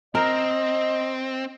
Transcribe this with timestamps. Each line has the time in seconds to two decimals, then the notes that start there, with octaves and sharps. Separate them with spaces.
0.15 C4 A#4 D#5